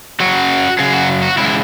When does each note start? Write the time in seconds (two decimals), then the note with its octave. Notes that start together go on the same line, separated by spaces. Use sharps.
0.20 F#2 C#3 F#3 F#4
0.79 F#2 C#3 F#3 G#4
0.93 F#4
1.23 F#4
1.38 E2 C#3 G#3 E4